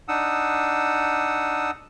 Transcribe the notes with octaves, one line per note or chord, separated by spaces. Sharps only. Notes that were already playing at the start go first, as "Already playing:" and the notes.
D4 D#4 F#5 D#6 E6